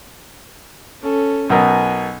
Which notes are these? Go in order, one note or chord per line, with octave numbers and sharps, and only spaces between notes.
C#4 A4
B1 B2 A#4 G#5